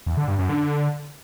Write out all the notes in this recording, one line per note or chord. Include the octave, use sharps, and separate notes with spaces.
E2
D3
G2
F#2
D3